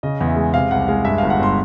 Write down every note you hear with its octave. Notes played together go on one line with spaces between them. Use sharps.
C#3 D#5
E2
E5
G#3
C3 F5
C2 F#5
G#3 F5
G2 E5
F5
G1
F#5
G1 C6